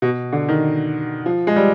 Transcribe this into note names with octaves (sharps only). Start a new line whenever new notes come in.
B2
D3
D#3
F3
G#3
G3